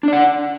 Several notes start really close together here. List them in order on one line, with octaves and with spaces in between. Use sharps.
D4 D5 F#5